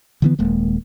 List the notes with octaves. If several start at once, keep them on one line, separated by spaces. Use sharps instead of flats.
D3 E3 B3
D#1 G#3 A#3